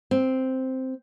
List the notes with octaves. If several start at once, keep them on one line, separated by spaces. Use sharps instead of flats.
C4